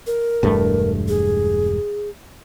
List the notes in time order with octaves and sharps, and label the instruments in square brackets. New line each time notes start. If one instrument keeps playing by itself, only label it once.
[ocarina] A#4
[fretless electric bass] E1 G2 A3
[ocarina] G#4